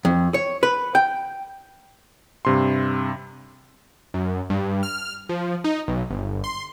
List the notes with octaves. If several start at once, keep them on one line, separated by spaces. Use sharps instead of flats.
F2
C#5
B4
G5
G2 C3 C6
F#2
G2
F6
F3
D#4
B1
G1
C6